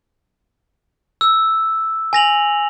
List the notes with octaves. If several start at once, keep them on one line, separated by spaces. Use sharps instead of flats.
E6
G#5 A#6 F7 F#7